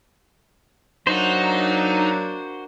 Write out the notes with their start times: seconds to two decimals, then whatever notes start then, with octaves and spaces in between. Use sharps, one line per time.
1.07 F#3 A#3 D4 D#4 F#4 C5